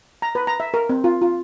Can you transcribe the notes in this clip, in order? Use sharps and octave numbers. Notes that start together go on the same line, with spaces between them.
A#5
B4
A#5
E5
A#4
C4
F4
F4